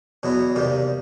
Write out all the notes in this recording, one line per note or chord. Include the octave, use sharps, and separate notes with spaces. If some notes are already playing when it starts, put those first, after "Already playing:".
E2 B2 F#3 B3 E4
E2 C3 D#3 G3 A#3